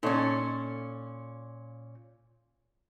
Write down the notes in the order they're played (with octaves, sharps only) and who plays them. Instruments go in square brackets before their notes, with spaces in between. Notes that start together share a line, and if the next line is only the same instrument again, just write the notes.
[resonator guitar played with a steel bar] A#2 C#4 [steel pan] D#4 A4 C#5